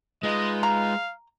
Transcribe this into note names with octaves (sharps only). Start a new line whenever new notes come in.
G#3 D#4 F4 B4 D#5
F5 A#5